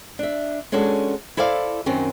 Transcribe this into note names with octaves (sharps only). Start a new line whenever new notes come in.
D4 E5
G#3 C#4 D4 F#4 A4
E4 A4 C5 D5 F5
F#2 D#3 C4 C#4